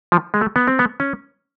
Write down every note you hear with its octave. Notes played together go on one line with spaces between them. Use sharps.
F3
G#3
A3
B3
C4
B3
C#4